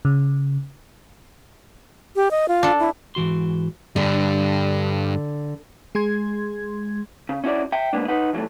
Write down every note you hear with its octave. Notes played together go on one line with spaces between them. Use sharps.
C#3
G4
D#5
F4
D4 A4
E4
G#2 E3 F#4 C6
G2 D3
G#3 G#4 C6 G#6
C#3
C#4 E4 F#4 D5
E5 G5
G#3 A#3 B3 D4
D#4 B4 F#5
E3 F#3 G#3 A3